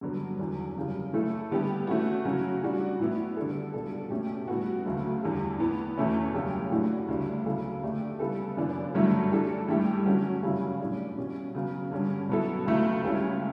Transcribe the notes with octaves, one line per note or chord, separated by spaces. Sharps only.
G2 D3 F#3 B3
E2 D3 F#3
F#2 C#3 E3 G3
E3 A3 E4 A4
D3 G3 B3 E4 G4
E3 A3 C#4 F#4
C#3 F#3 C#4 F#4
E3 G3 D4 F#4
A2 E3 B3 E4
D3 G3 D4 A4
C#2 B2 G3 D4 A4
B2 A3 C#4 G4
A2 G3 B3 F#4
D2 C#3 F#3 A3
E2 D3 G3
A2 E3 B3
E2 B2 A3 C#4 E4
F#2 C#3 G3 C#4 G4
A2 E3 A3 D4 F#4
D2 C#3 G3 D4
C#3 F#3 B3 E4 A4
D3 A3 D4 G4
C#3 G3 B3 E4 A4
F#2 C#3 E3 B3 D4
G2 D3 F#3 A3 E4
E3 G3 D4 A4
G2 E3 A3 E4 G4
D3 F#3 C#4 F#4
F#2 C#3 G3 C#4 E4
A2 E3 G3 D4
B2 G3 C#4
C#3 F#3 B3
G2 D3 G3 C#4
B2 F#3 B3 E4 A4
C#2 C#3 F#3 A3 E4
C#2 C#3 G3 C#4 E4